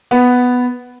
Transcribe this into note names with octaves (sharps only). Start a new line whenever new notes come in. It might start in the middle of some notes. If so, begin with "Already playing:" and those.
B3